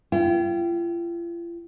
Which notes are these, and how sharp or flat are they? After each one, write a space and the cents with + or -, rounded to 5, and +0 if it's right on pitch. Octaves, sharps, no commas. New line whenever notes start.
F4 -45 G5 -20